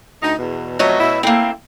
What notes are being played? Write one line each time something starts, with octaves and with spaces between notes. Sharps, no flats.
D2 D#4
E2 B2
F2 B2 F#3 A3 C#5 D#5
B2 E4
A3 A#3 C4 E4